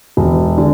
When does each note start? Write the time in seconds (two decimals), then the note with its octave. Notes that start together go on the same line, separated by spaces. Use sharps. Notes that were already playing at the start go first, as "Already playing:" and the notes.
0.17 E1
0.58 D3